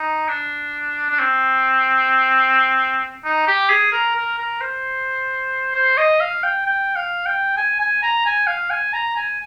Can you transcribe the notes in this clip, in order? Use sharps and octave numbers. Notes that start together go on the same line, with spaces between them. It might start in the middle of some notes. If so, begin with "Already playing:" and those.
Already playing: D#4
D4
D4
C4
D#4
G4
G#4
A#4
A#4
A#4
C5
C5
D#5
F5
G5
G5
F5
G5
G#5
G#5
A#5
G#5
F5
G#5
A#5
G#5